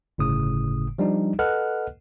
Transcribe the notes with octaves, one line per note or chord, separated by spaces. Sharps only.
G1 A2 C#3 D#6
F3 G3 D4 D#4
A4 B4 D#5 F#5 F6 F#6